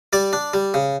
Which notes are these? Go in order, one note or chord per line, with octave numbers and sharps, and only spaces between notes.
G3 D5
D4
G3
C#3